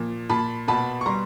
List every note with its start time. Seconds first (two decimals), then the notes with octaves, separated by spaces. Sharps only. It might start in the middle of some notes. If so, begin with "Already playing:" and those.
Already playing: A#2 F3
0.30 A#2 A5 B5
0.68 B2 A5 B5
1.01 C#6
1.06 G3 A#5 C6